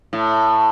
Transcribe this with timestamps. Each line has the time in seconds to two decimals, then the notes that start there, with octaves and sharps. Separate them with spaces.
0.13 A2